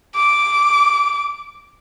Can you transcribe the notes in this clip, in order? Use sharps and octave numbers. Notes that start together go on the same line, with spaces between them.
D6